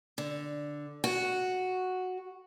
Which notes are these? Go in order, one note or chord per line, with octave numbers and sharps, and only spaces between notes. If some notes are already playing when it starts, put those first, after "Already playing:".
D3
F#4